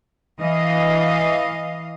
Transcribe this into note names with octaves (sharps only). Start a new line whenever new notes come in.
E3 D#5 F5